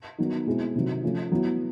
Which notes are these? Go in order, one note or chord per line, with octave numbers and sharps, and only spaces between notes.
D#3 F#3 B3 D#4
B2 G#3 C4 E4
C3 D#3 F#3
F3 A3 C#4 F4
F#3 B3 E4